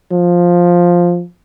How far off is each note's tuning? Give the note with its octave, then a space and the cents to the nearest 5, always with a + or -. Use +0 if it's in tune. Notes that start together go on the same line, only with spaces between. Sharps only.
F3 +5